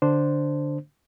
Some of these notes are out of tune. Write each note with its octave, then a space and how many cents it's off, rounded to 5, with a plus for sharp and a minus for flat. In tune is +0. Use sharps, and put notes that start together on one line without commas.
D3 +0 D4 +0 C5 -5